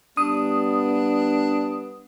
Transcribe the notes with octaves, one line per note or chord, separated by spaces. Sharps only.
G3 B3 D4 D#6